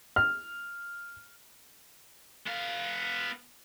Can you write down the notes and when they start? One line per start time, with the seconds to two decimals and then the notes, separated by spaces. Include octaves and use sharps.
0.16 F6
2.46 B3 F5